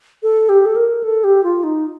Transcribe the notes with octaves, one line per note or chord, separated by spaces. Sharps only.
A4
G4
A4
A#4
A4
G4
F4
D#4